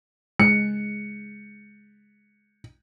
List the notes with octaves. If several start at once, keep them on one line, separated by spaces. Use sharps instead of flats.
G#3 C#7